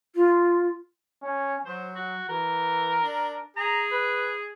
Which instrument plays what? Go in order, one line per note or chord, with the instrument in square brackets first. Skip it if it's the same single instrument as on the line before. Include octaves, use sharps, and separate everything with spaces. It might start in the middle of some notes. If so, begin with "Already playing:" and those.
[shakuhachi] F4
[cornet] C#4
[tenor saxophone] F#3 [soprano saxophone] C5
[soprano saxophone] F#4
[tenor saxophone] E3 [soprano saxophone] A#4
[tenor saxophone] D4
[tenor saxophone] G#4 [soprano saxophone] A#5
[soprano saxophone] B4